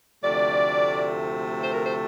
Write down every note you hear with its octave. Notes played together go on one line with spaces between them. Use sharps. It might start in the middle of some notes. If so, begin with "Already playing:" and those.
D2 C3 F3 A3 D5
C5
A#4
C5